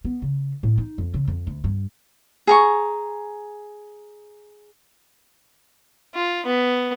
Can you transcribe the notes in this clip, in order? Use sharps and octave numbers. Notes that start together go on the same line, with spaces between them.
B3
C#3
A2
D#4
F2
C#3
F2
D2
G2
G#4 A#5 C#6
F4
B3